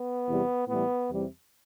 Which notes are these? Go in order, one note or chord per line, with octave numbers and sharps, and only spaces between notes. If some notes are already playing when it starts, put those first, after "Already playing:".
Already playing: B3
E2 C3 G3
A2 E3 G3 B3
E2 C3 G3